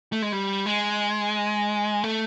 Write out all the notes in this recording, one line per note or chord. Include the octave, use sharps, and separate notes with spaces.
A3
G#3
G3
G#3
A3